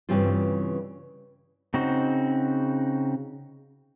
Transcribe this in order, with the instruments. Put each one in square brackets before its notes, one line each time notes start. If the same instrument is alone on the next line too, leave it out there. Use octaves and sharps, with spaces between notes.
[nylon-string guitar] G2 C#3 E3 G3 C4 F4
[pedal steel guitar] C#3 C4 D#4 F#4